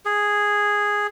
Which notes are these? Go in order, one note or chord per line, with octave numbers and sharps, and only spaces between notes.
G#4